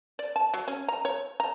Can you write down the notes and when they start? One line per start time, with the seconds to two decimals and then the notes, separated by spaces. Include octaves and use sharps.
0.19 D5
0.36 A5
0.54 F#3
0.68 C#4
0.89 A#5
1.05 C#5
1.40 A#5